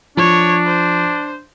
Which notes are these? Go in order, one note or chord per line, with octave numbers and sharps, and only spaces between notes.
F3 D4 C#5
C5